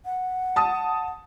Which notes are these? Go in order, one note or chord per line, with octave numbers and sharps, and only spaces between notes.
F#5
A5 D#6